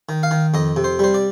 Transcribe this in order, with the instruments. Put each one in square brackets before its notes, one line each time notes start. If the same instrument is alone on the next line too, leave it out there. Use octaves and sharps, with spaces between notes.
[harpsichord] D#3
F5
D#3
F2 D#5
C3
C5
G3 C5
D5